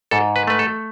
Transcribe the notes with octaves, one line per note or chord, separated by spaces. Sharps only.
G#2 A4
B4
A3 B4
A4